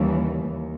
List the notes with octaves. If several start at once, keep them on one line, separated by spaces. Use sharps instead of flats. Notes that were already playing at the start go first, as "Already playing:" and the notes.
Already playing: D#2 C#3 E3 G3
D#2